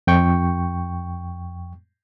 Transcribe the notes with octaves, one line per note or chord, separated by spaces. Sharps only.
F2 G5 C#6